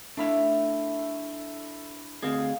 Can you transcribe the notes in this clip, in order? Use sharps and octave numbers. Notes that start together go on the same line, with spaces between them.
A3 D4 E4 E5 F5
D2 C4 G#4 D#5 F5